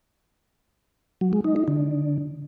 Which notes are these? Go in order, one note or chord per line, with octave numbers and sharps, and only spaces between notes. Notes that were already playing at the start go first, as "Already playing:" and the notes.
F#3
G#3
D#4
D#4
D3